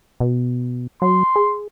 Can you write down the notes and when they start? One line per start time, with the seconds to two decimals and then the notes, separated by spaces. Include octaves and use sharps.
0.20 B2
1.02 F#3 C6
1.36 G#4